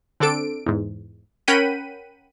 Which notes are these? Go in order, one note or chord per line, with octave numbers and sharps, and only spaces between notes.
D3 C4 D4 A4 D7
E2 G#2
C#4 A#4 F#5 G5 B5 D#7